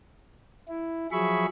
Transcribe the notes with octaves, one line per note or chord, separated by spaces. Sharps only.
E4
F3 F#3 G#4 E5 B5 C#6